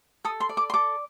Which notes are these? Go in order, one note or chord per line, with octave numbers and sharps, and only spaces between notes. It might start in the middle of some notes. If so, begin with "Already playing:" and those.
A4 D#6
C6
D5
D6
C6
A4 D6